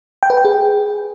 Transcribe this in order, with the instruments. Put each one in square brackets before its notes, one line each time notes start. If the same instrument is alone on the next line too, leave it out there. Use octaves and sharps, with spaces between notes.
[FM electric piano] G5
B4
G5
G#4